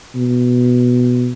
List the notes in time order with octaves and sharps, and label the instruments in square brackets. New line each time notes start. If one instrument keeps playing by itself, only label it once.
[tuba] B2